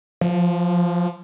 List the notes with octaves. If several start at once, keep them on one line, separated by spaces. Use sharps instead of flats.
F3